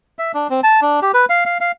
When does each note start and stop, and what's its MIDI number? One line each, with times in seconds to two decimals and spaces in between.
0.19 0.32 76
0.34 0.47 62
0.50 0.61 60
0.63 0.80 81
0.82 1.00 62
1.02 1.12 67
1.14 1.25 71
1.30 1.44 77
1.46 1.58 77
1.61 1.72 77